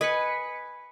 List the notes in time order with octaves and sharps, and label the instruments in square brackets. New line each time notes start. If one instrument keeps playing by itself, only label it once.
[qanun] B4 G#5 [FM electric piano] D#5 B6 C#7